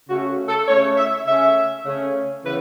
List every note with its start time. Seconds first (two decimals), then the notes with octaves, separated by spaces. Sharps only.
0.09 C#3 A3 C#4 F#4
0.48 A4
0.68 C#3 A3 C#4 C#5
0.97 E5
1.26 C#3 A3 C#4 E5
1.86 C#3 A3 C#4
2.45 C#3 E3 B3 B4